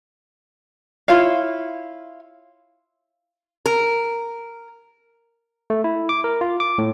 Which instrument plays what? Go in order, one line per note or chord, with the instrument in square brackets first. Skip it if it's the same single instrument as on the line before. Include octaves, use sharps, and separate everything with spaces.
[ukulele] E4 F4 C#5 F5
[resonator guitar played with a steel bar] A#4
[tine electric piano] A3
E4
D6
A#4
F4
D6
A2